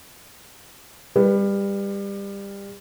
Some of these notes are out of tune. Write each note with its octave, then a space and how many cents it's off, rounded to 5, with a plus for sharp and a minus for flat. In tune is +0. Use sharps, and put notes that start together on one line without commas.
G3 +25 B4 +0